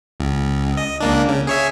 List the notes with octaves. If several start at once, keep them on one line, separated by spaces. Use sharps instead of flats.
C#2
D#5
C#2 A#3 D4
C#3
G#4 C#5 E5